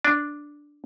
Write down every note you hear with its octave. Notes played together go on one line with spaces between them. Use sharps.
D4